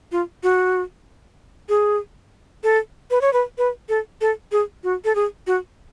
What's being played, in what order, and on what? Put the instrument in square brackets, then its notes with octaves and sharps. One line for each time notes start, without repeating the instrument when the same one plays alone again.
[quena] F4
F#4
G#4
A4
B4
C#5
B4
B4
A4
A4
G#4
F#4
A4
G#4
F#4